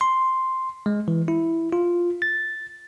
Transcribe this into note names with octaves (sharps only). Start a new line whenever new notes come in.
C6
G#3
E3
E4
F4
A6